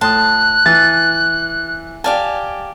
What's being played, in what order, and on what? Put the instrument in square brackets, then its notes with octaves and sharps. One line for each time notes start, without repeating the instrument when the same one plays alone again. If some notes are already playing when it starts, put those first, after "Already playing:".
[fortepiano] A2 D#6 [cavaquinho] A5 C6 [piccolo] F#6
[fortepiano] E3 [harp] A6
[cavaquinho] G4 F5 G#5 [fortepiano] D5 A5